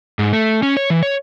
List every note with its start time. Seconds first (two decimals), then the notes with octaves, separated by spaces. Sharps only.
0.19 G#2
0.33 A3
0.63 C#4
0.77 C#5
0.90 E3
1.03 C#5